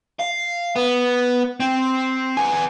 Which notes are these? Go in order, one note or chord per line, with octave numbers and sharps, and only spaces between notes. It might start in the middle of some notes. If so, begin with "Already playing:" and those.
F5
B3
C4
B3 G#5